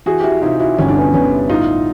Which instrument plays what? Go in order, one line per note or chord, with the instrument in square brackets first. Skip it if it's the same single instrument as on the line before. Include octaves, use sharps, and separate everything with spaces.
[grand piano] E3 F#4 G#4
G4
E4 F#4
C3 D#4 F4
E4 F#4
G1 C#4
D4
B3 C#4
G1 B3 C#4
A2 D#4 F4